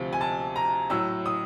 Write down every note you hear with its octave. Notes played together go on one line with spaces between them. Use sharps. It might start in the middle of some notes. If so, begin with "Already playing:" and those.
Already playing: D2 C3 F3
G#5
A5
A#5
A2 F#3 E6
D#6